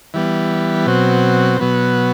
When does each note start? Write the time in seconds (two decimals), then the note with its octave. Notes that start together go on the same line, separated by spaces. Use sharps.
0.14 E3 G3 B3
0.86 B2 F#3 C4
1.59 B2 F#3 B3